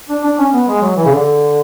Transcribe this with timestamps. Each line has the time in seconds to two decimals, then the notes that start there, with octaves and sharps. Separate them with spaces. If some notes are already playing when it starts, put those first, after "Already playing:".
0.09 D4
0.24 D4
0.38 C#4
0.53 B3
0.68 G#3
0.82 F#3
0.96 E3
1.06 C#3
1.10 D3